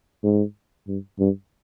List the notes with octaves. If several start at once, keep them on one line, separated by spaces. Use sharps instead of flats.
G#2
G2
G2